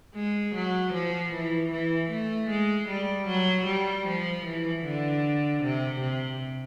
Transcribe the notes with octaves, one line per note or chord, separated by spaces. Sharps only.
G#3
F#3
F3
E3
E3
A3
G#3
G3
F#3
G3
F3
E3
D3
C3
C3